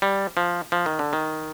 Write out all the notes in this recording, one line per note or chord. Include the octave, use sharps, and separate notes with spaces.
G3
F3
F3
D#3
D3
D#3